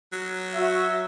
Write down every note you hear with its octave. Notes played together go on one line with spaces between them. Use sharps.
F#3
F#4 E5